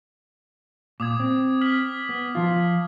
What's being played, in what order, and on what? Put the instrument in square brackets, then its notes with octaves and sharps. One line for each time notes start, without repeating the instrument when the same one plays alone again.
[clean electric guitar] A#2 [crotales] D6 D#6 G#6
[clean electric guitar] C4
[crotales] F6 B6 F#7
[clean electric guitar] B3
F3 F4